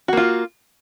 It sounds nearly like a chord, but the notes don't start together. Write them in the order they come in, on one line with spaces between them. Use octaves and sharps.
F#4 A#3 F4